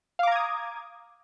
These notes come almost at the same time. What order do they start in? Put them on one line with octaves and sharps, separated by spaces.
F5 D6 A#5 G#6 D#6